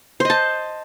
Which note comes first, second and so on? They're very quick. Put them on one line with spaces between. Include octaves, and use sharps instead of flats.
C5 D#5 A5